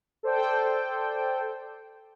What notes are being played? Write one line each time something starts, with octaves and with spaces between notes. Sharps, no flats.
A4 C5 D5 G5